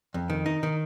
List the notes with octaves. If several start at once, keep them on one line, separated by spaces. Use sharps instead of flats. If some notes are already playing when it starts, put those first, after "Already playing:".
F2
D#3
D#4
D#3